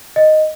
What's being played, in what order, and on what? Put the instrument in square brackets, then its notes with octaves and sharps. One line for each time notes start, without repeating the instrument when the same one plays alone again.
[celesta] D#5